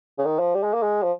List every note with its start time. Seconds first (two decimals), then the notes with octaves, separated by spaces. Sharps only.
0.18 C#3
0.25 D#3
0.39 F3
0.55 G3
0.63 G#3
0.74 A#3
0.83 G#3
1.03 F3